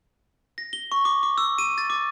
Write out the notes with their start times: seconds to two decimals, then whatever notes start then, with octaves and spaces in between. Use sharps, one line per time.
0.58 A#6
0.73 G7
0.92 C#6
1.05 D6
1.23 D6
1.38 E6
1.58 D#7
1.78 A6
1.90 D6